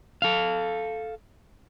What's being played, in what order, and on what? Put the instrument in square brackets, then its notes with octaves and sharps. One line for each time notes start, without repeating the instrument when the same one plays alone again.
[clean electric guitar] A4 F5